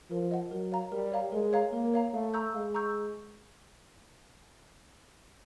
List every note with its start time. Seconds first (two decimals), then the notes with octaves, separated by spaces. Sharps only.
0.10 F3 A#4
0.31 D#5 F#5
0.51 F#3 A#4
0.72 C#5 F5 A#5
0.92 G3 A#4
1.12 C#5 F5 A#5
1.32 G#3 A#4
1.53 C#5 F5 A#5
1.72 A#3 A#4
1.94 C#5 F5 A#5
2.13 A3 F5
2.34 A#5 C#6 E6 G6
2.54 G#3 F5
2.74 A#5 C#6 E6 G6